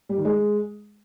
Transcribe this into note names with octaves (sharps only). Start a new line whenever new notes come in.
G3
D#3
G#3